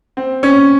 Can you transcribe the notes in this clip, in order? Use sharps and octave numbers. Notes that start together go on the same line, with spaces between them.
C4
C#4